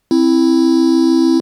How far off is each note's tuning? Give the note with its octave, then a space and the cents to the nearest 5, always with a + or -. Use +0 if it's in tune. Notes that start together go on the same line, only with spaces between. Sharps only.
C4 +10 E4 +0